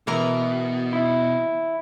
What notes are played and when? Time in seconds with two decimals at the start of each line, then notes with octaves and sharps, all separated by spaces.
0.07 B2 E3 A#4 A#5
0.93 E4